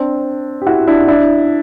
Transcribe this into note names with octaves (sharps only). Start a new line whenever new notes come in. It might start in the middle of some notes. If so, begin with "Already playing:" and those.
Already playing: C4 D4
G4
E4 F#4
D4 E4
D4 E4